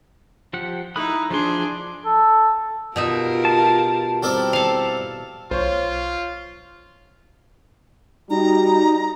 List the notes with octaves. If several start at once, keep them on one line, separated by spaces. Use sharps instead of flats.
F3 G4 F#5
D#4 E4 B5 D#6 F#6
F3 D4 G#4 C6
A4
B2 D#4 F4 G4 A#4 E5
A5
G3 C4 E4 A#4 D5
A4 F5
B1 F4 C5 C#5
G3 D#4 F#4 A#5